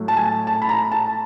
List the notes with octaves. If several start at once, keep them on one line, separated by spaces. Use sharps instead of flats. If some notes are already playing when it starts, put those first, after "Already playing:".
Already playing: A2 F#3 A3
A5
G#5
A5
B5
A#5
A5